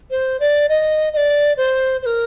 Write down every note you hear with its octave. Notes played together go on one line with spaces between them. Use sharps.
C5
D5
D#5
D#5
D5
C5
C5
A#4